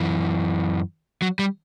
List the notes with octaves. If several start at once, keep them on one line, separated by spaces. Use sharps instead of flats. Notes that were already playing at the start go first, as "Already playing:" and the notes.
Already playing: F#2 E3
F#3
G3